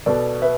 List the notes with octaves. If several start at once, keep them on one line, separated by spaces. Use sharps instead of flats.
B2 B3 A4 D5
B4 E5